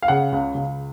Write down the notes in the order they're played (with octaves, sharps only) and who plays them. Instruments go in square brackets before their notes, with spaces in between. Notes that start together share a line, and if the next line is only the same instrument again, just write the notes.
[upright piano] F5
C#3 F#5
C#2
C#2